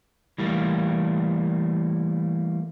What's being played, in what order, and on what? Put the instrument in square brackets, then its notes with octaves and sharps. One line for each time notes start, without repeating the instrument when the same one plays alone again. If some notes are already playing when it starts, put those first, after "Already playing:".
[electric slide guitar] E3 G3 A3 A#3